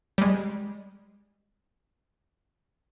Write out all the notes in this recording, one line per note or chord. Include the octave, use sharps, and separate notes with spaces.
G3 G#3